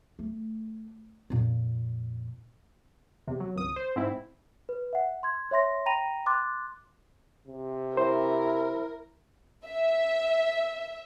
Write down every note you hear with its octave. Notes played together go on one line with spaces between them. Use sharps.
A3
F2 A#2
E2 C3
F#3
G#1 C#2 D#6
C5
G#2 C4 E4
B4
E5 F#5
C6 G#6
C#5 E5 C6 A#6
G5 A#5 B5 A#6 D#7 F7
C6 D6 F#6 A6
C3
E4 A#4 C5
E5